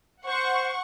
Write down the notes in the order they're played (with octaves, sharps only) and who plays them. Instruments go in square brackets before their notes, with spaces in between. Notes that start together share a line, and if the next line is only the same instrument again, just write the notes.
[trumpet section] C5 [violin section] F#5 C#6